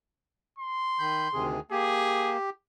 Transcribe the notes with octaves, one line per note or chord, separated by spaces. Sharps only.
C6
D#3 B5 G6
D2 C3 D#3 G#4
A#3 G4 G#4